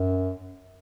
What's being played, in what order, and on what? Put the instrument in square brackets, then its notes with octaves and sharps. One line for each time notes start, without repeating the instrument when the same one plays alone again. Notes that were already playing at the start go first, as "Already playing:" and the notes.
Already playing: [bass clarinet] F#2